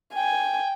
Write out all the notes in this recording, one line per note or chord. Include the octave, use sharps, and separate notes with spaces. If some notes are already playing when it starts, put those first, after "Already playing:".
G5 G#5